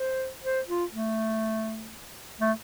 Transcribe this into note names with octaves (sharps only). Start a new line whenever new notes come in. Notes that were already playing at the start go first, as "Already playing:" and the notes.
Already playing: C5
C5
F4
A3
A3